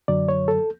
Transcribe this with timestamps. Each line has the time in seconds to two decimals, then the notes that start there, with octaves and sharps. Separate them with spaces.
0.08 F#2 D3 F#3 D5
0.29 C#5
0.48 A4